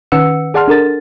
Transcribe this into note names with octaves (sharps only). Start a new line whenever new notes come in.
D#3 C#4 B4 F#5 E6 C#7
G#4 D5 F#5 A5 C6 F6
D4 A4 A#4 A6